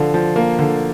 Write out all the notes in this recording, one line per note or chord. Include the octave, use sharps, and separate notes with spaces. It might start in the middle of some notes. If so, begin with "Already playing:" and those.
Already playing: D3 F3 D5 F5
F3
A#3
D3